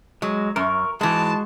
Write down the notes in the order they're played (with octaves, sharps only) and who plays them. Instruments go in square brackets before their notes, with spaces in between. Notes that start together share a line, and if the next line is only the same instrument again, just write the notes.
[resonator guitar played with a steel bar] F#3 [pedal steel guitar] G#3
[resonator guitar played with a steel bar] F#2 [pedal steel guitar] A#4 C#6
[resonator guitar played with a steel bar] G#2 E3 [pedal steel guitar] G#3 F#4 [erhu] A5